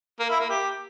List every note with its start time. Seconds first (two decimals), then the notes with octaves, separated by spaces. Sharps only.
0.20 A#3
0.30 E4
0.40 A#3
0.50 G4